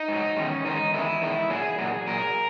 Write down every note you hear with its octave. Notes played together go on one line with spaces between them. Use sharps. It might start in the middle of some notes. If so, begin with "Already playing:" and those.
Already playing: D#4
G#2 F#3
E2 D#3 G#3 C#4
E2 D#3 G#3 D#4
E2 D#3 G#3 E4
E2 D#3 G#3
A#2 F#3 G#4
A#2 F#3
A#2 F#3 A#4